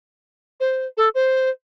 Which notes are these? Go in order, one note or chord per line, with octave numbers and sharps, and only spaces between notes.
C5
A4
C5